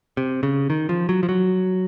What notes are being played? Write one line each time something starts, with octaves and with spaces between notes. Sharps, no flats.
C3
C#3
D#3
F3
F#3
F3
F#3